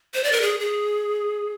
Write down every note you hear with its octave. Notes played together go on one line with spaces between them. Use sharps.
C5
D5
A#4
G#4
G#4